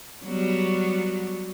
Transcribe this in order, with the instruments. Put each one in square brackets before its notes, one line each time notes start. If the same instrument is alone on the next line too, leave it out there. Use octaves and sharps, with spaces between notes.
[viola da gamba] F#3 G3 B3